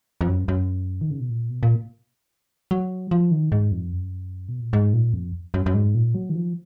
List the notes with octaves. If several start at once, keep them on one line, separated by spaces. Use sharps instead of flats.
F2
F#2
F#2
D#3
C#3
B2
A#2
B2
A#2
F#3
F3
D#3
G#2
F2
F#2
B2
A#2
G#2
A#2
F2
F#2
F#2
G#2
A#2
F#3
D#3
F3